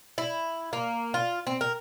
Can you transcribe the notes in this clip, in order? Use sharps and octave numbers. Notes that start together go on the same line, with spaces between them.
E4
A#3
F4
C4
A#4